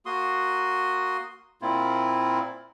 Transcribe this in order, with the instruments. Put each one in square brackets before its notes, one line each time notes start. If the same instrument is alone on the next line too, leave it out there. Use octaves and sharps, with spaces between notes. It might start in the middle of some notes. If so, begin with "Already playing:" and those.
[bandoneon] A#3 F#4 C6 D#6
A#2 A#3 C4 E4 F4